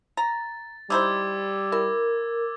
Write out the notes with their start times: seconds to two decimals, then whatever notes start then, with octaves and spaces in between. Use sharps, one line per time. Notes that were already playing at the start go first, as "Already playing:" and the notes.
0.17 A#5 A6
0.90 G3 D#4 E4 C5 D6 E6 G#6
1.72 E4 A#4